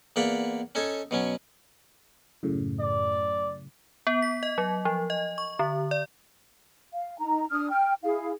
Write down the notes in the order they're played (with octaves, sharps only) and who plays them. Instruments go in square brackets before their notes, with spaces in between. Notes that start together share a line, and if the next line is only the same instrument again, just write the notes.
[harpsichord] E2 A#3 D5 F#5 B5
C#4 D#4 A4 C#5
B2 F#3 C#4
[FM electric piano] F#2 A2 C#3
[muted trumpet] D5
[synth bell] B3
B6
D#5
F#3
F3
D#5
C#6
D3
D5
[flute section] F5
D#4 A#5
D4 D#6 F6
G5 F6
E4 G#4 F5